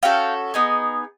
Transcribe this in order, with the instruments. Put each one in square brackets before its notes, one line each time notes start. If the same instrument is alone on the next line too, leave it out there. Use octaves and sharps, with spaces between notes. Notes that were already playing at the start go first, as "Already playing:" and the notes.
[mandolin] C#4 F#4 A4 F5 G5
B3 D#4 G#4